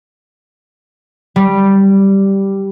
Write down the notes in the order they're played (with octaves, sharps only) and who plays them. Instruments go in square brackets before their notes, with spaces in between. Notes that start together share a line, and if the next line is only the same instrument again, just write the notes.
[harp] G3